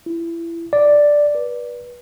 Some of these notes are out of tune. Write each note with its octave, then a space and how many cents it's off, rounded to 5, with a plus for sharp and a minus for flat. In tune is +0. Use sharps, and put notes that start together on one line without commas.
E4 +25
D5 +0
B4 -30